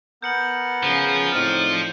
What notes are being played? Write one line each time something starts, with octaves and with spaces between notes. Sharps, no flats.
B3 A#4 G6 C#7 F#7
C#3 F3
A2 C4 D#4 D5 F6 D#7